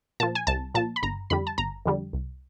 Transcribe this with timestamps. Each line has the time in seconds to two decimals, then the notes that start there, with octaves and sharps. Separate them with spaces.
0.20 A#2 F3 A5
0.35 G#5
0.47 C2 A5
0.75 A#2 F3 A5
0.96 B5
1.03 G1 A#5
1.30 F2 D3 G3 B5
1.47 A5
1.58 G1 A#5
1.86 F2 D3 G3
2.13 C2